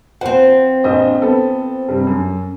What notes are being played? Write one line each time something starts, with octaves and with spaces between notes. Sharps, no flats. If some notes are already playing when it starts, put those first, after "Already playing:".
F3 C4 B4 F#5
A#1 C5 D#5
B3 A4
G2 C3 G3
F#2